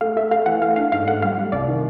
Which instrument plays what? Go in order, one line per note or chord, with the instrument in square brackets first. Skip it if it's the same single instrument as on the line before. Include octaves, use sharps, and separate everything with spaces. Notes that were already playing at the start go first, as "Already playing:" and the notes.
[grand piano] A3 [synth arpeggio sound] F5
[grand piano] A3 [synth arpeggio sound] E5
[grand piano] A3 [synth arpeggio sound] F5
[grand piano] E3 [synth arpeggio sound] F#5
[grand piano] A3 [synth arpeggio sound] F5
[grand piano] D4 [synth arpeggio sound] F5
[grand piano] G#2 [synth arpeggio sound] F5
[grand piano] A3 [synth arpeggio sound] F#5
[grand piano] G3 [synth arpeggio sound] F5
[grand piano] G3
[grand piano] C2 [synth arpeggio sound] D5
[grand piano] D#3